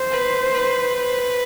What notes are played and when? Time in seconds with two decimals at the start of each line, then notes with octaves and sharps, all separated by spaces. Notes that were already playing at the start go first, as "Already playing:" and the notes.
Already playing: C5
0.11 B4
0.53 B4